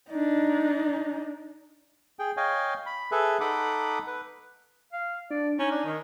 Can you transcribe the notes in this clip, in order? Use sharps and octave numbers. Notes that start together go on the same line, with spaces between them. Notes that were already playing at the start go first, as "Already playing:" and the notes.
D4 D#4
G#4 G5
C#5 D#5 F5 G5 G#5
B5
G#4 A4 B4 E5
D#4 A4 F#5 B5 D6 D#6
B4
F5
D4 D5
C#4 D#4 G#5
D4
D#3